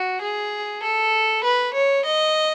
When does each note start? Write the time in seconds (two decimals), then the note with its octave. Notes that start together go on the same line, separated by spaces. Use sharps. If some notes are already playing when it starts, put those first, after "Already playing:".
Already playing: F#4
0.22 G#4
0.83 A4
1.44 B4
1.74 C#5
2.05 D#5